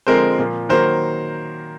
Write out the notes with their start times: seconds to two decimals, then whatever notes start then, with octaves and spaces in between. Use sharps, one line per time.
0.07 D3 F3 G#3 C4 A#4 C5
0.38 A#2 F3 A#3
0.69 D#3 F#3 A#3 A#4 C5